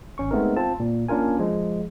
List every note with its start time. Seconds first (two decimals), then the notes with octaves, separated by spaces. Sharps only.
0.18 G#1 C#4 C#6
0.31 G#3 A3 B3 C4 D#4 A#4
0.56 C4 F4 A5
0.80 A#2
1.09 A#3 C#4 D4 F4 A#4 G#5
1.39 F3 G#3